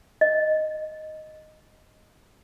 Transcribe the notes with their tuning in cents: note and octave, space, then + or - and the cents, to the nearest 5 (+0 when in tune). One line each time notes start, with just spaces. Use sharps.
D#5 +0